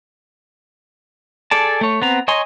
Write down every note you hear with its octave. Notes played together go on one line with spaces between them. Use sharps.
G#4 A4 D5 A5
A3 C#5
B3 C4 A#5
C#5 D#5 G#5 A#5 C6